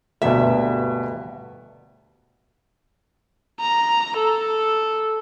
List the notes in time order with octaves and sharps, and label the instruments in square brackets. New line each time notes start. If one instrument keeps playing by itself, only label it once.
[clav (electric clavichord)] D2 G2 [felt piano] B2 A#3 [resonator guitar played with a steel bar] E5
[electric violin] A#5
A4